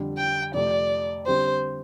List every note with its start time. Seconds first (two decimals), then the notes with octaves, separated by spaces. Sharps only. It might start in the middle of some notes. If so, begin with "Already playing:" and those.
Already playing: F2 D3 G3 D4
0.17 G5
0.53 F2 C3 A3 D5
1.26 D3 G3 C4 G4 C5